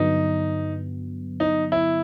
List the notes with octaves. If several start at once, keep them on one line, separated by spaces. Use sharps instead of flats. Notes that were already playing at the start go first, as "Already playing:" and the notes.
Already playing: G2 D3 F#3 B3 D#4
D#4
E4